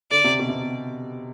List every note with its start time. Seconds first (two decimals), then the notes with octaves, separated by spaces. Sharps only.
0.11 D3 D5
0.24 C3
0.39 B2
0.49 C3